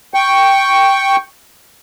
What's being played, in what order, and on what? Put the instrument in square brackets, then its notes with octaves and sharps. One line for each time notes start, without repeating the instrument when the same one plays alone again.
[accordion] G5 C#6